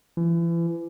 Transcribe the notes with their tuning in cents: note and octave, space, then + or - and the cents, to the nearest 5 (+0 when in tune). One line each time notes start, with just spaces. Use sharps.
E3 +35